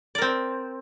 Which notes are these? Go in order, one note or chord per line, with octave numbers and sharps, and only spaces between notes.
C4 A#4 D5